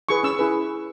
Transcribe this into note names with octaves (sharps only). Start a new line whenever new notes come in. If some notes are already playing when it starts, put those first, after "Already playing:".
E4 G#4 B4 C#6
C#4 E6
E4 G#4 B4